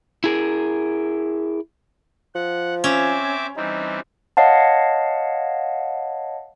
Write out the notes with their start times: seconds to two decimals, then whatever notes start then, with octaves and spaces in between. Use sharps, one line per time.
0.24 E4 G#4 A#4
2.35 F3 F#5
2.84 C4 C#4 E5 D6
3.56 E3 G3 C4 D#4
4.37 C#5 D#5 F5 F#5 A5